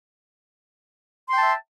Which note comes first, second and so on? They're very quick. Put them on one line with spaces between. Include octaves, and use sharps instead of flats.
C6 G5 A5 E5